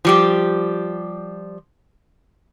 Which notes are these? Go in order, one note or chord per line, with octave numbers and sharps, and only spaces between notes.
F3 G3 G4